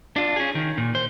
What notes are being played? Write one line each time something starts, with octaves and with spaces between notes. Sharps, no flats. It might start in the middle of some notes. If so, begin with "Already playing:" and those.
D4 F4
C#4 G#4
D#3
A#2
C5